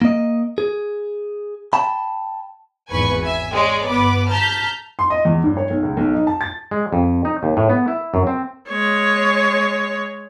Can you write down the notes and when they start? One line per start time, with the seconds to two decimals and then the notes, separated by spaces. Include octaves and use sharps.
0.02 A#3 D#5
0.58 G#4
1.73 G5 A5 B5
2.89 G#1 E2 B4 G#5 C#6
3.23 E5 G#5
3.53 G#3 C#5 D5
3.85 G1 B3 B4 D6
4.28 A5 A#5 F6 G6 B6
4.99 C6
5.10 D#5
5.25 E2
5.44 G2
5.57 C#5
5.70 B1
5.83 C#2
5.97 B1
6.14 D#4
6.27 A5
6.41 A6
6.71 G#3
6.93 F2
7.25 D#4
7.43 D#2
7.57 A2
7.70 B3
7.88 E4
8.14 F#2
8.27 C4
8.69 G#3 C#5